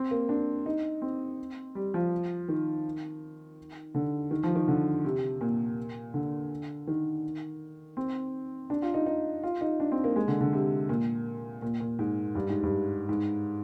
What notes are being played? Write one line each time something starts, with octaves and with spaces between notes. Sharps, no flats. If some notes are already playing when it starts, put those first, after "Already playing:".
Already playing: C4
A#3
D4
D#4
C4
G3
F3
D#3
D3
D#3
F3
D#3
D3
C3
A#2
D3
D#3
C4
D4
F4
D#4
D#4
F4
D#4
D4
C4
A#3
G#3
D3
D3
C3
A#2
A#2
A#2
G#2
G2
G#2
G2
G#2